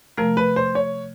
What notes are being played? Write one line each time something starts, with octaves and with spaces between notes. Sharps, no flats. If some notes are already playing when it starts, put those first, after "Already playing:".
C3 F3 A3 A#4
B4
C5
C#5